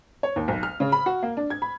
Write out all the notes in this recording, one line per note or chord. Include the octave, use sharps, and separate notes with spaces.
C#5
D#2
B1
F6
C#3
B5
F#4
A#3
D4
G#6
B5